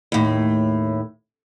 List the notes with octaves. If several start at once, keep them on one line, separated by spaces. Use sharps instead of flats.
D#2 A2